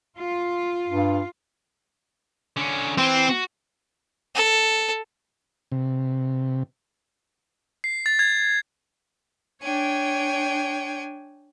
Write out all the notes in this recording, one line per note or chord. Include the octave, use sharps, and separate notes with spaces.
F4
G2
D3 C#4
E3 C4
F#4
A4
C3
C7
A6
G#6
D4 C#5 G5 G#5